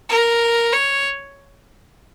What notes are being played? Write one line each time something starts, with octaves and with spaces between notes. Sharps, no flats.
A#4
C#5